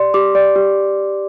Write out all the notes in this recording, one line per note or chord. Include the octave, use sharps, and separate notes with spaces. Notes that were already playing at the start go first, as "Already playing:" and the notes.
Already playing: G4 D5 C6
G4 D6
D5
G4